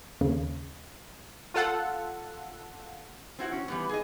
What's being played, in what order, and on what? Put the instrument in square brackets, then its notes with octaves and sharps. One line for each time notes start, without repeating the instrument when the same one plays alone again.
[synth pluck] D#2 C#3
[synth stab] F4 A4 F#5
[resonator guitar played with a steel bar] C4 E4 F#4
C#4
E3 G3 B3
G#4 D#5